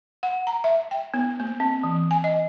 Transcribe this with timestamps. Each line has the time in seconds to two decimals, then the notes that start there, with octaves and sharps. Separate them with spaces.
0.23 F#5
0.47 A#5
0.64 E5
0.91 G5
1.14 B3
1.40 A#3
1.60 C4
1.83 E3
2.11 G#5
2.24 D#5